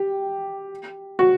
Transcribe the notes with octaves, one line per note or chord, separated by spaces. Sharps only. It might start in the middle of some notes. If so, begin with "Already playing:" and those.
Already playing: G4
F#4